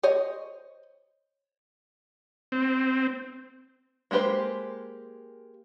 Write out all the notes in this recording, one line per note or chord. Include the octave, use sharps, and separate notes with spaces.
C5 C#5 D#5
C4
G#3 A#3 G4 B4 C5